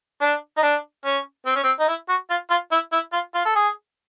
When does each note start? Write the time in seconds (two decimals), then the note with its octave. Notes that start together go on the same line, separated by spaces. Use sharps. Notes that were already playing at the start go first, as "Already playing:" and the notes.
0.21 D4
0.57 D#4
0.63 D4
1.05 C#4
1.46 C4
1.55 C#4
1.64 C4
1.80 D#4
1.88 E4
2.09 F#4
2.30 F4
2.50 F4
2.72 E4
2.92 E4
3.13 F4
3.34 F4
3.45 A4
3.55 G#4